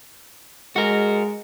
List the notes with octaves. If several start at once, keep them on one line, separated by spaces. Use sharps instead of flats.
G#3 F#4 A#4